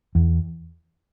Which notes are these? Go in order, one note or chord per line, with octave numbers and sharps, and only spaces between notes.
E2